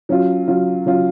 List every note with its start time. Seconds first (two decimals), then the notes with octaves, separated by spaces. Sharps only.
0.09 F#3 C#4 F4
0.48 F#3 C#4 F4
0.86 F#3 C#4 F4